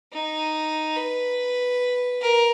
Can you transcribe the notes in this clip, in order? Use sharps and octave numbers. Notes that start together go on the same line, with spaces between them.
D#4
B4
A#4